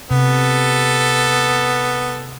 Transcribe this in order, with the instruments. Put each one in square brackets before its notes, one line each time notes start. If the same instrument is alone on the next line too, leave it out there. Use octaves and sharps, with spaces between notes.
[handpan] C3 [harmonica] B3 [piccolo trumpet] A4